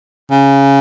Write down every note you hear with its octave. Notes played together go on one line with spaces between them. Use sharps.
C#3